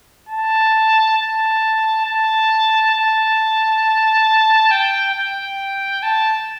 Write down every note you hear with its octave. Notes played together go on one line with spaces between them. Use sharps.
A5
A5
A5
A5
G5
G5
A5